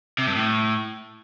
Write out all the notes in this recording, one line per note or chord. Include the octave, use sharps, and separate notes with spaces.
C3
G2
A2